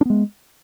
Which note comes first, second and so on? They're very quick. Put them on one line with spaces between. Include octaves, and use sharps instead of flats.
D4 B3 G#3